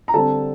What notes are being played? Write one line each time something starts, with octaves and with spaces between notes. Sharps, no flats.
A#5
D3 G3 C4 A4 A5